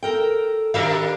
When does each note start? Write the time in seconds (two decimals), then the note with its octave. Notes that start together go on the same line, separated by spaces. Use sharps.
0.03 A4 A#4 G5
0.74 D#3 G3 D4 A#4 E5 F5